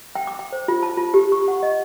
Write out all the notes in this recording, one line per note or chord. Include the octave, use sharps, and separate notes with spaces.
G5
D6
G5
C5
F4
A5
F4
G4
C#6
F#5
D#5